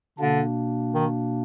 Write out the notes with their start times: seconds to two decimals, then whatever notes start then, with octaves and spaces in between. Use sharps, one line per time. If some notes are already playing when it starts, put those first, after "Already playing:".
0.18 B2 D3 A#3 D4
0.94 D#3